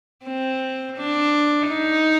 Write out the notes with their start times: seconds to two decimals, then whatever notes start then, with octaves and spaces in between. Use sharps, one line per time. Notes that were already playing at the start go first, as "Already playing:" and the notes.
0.25 C4
0.97 D4
1.69 D#4